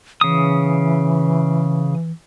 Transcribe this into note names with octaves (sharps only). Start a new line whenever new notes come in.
C#3 E3 D#6